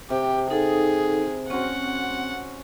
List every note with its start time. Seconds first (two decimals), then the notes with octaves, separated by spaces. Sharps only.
0.10 C3 G4
0.50 D#4 G#4 A4 F#5
1.50 C4 C#4 F#4 C5 F#5